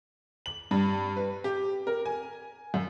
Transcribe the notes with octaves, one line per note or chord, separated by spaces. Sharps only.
F#7
G2
B4
G4
A#4
G#5
F#2